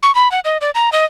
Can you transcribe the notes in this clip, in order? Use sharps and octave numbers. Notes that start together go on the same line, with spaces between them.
C#6
B5
F#5
D#5
D5
A#5
D#5